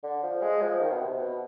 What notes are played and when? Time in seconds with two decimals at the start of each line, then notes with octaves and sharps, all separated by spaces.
0.04 D3
0.23 F3
0.42 G#3
0.62 F3
0.81 D#3
0.91 B2
1.00 C3
1.19 B2